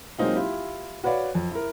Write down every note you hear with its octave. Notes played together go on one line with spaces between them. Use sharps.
F#3 G#3 A#3 C4 D#4 F4
E4 F4 G4
F#4 B4 C#5 D5 F5
F2
E4 A#4